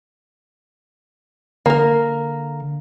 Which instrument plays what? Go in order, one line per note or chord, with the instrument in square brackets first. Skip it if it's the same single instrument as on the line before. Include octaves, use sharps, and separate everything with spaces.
[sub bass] D3 [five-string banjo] A#3 A#4